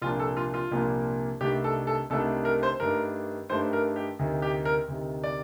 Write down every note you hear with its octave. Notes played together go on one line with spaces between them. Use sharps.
C2 A#2 F3 A#3 D4 F4
A4
F4
F4
C2 A#2 F3 A#3 D4
C2 C3 D#3 A3 D4 G4
A4
A4
C2 C3 D#3 A3 D4 A4
A#4
C5
G2 D#3 A3 D4 A#4
G2 D#3 A3 D4 C5
A#4
G4
D2 C3 D#3
G4
A#4
D2 C3 D#3
D5